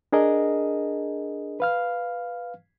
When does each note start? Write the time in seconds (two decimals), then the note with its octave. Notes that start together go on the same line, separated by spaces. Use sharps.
0.12 D4 G#4 A#4 D#5
1.60 B4 F5 F6